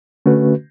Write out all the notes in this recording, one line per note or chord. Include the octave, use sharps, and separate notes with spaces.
D3 A3 C#4 F#4 B4